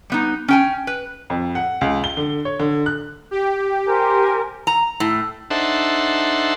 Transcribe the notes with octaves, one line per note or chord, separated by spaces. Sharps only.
G3 B3 D#4
C#4 G5 G#5
B4
F2
F#5
C#2
G7
D3
C#5
D3
F#6
G4
A#4 C5 G#5
A#5
A2
D4 D#4 A4 C5 E5 F#5